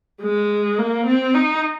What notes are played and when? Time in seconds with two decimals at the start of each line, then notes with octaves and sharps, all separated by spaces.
0.22 G#3
0.78 A#3
1.06 C4
1.34 D#4